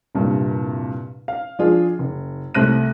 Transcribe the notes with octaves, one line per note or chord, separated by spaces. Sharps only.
C2 G2 A#2
F5
F3 D4 F4 G#4
F#1
C2 A3 C5 F#6 A#6 D#7